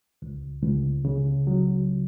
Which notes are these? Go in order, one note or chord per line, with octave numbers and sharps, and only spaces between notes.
C#2
C#2
C#3
F#3